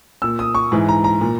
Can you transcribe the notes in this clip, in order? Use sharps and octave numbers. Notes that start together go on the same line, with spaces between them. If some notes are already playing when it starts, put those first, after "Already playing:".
A#2 E6
D#6
C#6
G#2 E3
A#5
A#5
A#2